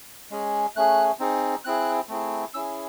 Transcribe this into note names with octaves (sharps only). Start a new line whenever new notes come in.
G#3 C#4 G#4
A3 C#4 G#4 F#6
C4 D#4 G#4
C4 E4 G#4 F#6
A3 C4 E4 G#4
C#4 E4 G#4 E6